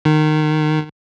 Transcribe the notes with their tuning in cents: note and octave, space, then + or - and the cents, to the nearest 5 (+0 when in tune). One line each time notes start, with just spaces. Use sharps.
D#3 -20